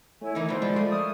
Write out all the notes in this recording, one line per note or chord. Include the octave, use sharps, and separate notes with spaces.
A3 E4 C#5 G#5
E3 D#4 A#4 E5
B2 F3 C5 D5 B5
F3 G#3
A3 A#3
C#6 D#6 F6